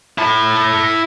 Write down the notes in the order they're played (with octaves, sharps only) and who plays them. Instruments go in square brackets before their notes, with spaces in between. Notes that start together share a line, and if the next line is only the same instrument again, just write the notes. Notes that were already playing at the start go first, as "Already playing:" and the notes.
[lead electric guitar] E4 A5